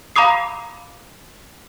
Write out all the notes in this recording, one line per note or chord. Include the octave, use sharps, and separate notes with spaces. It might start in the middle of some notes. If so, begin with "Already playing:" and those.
F5 A#5 B5 D6 D#6 C7